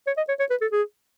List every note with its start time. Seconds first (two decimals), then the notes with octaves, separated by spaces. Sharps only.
0.07 C#5
0.17 D#5
0.28 C#5
0.40 C#5
0.50 B4
0.61 A4
0.72 G#4